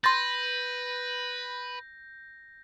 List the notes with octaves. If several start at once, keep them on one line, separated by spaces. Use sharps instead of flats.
B4 C6 G6 A6 A#6